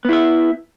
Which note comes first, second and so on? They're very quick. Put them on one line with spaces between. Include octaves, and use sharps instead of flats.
B3 E4 E5